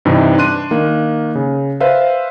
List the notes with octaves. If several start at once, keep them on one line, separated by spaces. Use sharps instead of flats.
G2 C3 E3 D#4
D4 C6 F#6 D#7
D#3 A#3
C#3
B4 C5 E5 F5